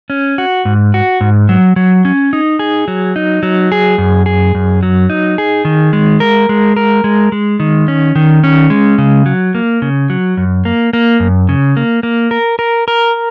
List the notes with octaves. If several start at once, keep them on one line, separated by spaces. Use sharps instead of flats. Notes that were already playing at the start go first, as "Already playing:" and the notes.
C#4
F#4
G#2
F#4
G#2
F#3
F#3
C#4
D#4
G#4
F#3
D#4
F#3
G#4
F#2
G#4
F#2
F#3
D#4
G#4
D#3
G#3
A#4
G#3
A#4
G#3
G#3
D#3
C#4
D#3
C#4
G#3
C#3
F#3
A#3
C#3
F#3
F#2
A#3
A#3
F#2
C#3
A#3
A#3
A#4
A#4
A#4